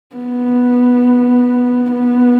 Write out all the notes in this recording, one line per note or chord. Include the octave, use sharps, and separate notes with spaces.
B3
B3